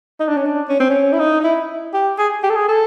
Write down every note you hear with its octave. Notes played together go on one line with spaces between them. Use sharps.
D#4
D4
C#4
D4
C#4
C4
C#4
E4
D#4
D#4
E4
G4
G#4
G4
A4
G#4
A4